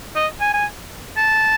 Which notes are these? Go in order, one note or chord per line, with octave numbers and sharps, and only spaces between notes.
D#5
G#5
G#5
A5